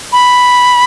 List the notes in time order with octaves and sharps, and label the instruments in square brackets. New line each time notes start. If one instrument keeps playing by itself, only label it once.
[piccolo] B5